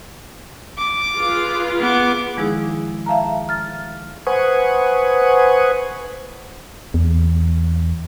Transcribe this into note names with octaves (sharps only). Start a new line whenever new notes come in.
D6
F4 G#4 B4
B3 D6
D#3 F3 G#3 D#4 E4 G#4
E5 F5 A5 A#5
F6 A6
B4 C5 F#5 G#5 C#6 D#6
E2